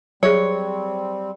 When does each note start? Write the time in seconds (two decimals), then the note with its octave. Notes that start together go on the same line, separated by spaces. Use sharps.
0.23 F#3 G3 C4 G#4 C#5